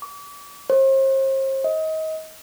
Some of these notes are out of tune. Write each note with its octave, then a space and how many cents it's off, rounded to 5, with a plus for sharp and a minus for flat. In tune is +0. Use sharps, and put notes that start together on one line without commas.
D6 -40
C5 +40
D#5 +30